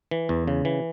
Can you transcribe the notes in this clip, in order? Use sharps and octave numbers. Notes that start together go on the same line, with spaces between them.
E3
E2
C#3
E3